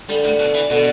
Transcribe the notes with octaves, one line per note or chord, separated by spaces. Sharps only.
D3 G3
A2
B2
E3
B2 D3